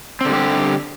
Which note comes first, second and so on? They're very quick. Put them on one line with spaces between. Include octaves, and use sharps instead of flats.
C4 D3 G3 G4